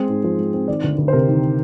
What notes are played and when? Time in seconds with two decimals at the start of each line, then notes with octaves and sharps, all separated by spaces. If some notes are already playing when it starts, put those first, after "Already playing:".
Already playing: G#3 C4 G#4
0.09 G#2
0.23 F3 C5
0.38 G#3
0.54 C4
0.68 D#3 D5
0.84 D2
0.98 D2
1.08 C5
1.13 C3 A#4
1.28 D#3